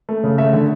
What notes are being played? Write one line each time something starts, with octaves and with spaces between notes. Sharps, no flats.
A3
C#3
A3 E5
D3